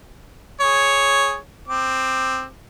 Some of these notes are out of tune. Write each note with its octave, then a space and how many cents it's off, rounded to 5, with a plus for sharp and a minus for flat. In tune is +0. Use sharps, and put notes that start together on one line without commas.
G#4 +0 C#5 +0
C4 +0 D6 +20